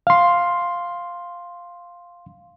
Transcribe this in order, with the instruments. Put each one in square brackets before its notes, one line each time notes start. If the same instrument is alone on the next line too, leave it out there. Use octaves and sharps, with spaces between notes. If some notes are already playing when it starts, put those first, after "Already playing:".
[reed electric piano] F5 C6